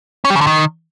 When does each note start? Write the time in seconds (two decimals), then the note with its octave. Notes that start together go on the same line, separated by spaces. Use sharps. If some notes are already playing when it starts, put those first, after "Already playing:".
0.25 C#4
0.30 G3
0.36 C#3
0.41 D3
0.47 D#3